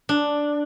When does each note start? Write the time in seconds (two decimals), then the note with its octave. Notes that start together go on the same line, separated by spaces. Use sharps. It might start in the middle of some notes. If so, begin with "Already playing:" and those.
0.09 D4